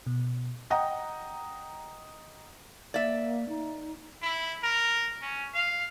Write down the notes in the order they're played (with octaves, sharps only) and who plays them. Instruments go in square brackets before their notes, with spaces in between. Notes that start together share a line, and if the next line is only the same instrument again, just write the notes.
[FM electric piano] B2
[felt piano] D#5 F#5 G5 A#5 D#6
[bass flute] A#3 [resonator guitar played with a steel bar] D5 E5
[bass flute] D#4
[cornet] E4
A#4
C#4
F5